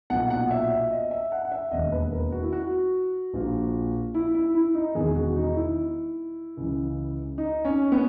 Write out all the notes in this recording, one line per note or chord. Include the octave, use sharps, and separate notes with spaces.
B1 A#2 F#5
F#5
E5
E5
D#5
E5
F#5
F#5
E5
E1 D#2 D#3 D#5
B4
A#4
F#4
E4
F#4
A#1 A#2
E4
E4
E4
D#4
E1 E2 D#3 G#4
F#4
D#4
E4
C#2 C#3 E3
D#4
C#4
B3